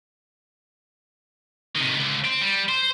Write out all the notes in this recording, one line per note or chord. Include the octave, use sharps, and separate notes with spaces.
C3 D#3
C#2 D3
C4
G3
C5